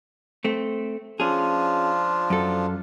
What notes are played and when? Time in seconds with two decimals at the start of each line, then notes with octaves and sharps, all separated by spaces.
0.44 A3 C4
1.20 F3 C#4 D4 F4 G#4
2.30 F#2 A4